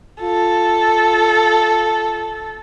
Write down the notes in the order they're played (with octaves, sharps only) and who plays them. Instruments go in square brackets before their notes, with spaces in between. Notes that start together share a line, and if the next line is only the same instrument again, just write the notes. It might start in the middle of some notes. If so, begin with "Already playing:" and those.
[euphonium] F4 [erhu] A4